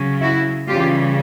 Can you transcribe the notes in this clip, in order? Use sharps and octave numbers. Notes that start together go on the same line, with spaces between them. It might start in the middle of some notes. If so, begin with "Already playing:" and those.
Already playing: C#3 F#3
E4 F#4
C#3 E3 G3 F4 G4